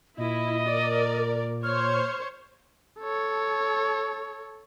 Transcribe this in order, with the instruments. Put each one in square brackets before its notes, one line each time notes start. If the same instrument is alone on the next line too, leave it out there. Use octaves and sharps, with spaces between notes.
[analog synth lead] A#2 [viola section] E4 [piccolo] D#5
[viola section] A#4 D5
[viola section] C5 C#5 [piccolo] F6
[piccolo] F6
[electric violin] A4 C#5